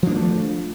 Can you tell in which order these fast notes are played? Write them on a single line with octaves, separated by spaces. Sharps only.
F3 D4 A#3 A3